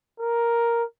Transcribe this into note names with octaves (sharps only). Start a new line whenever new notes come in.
A#4